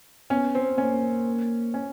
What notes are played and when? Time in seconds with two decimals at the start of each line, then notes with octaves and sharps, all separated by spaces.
0.30 B3 C#4
0.55 C4
0.78 A#3 C#4
1.74 C#4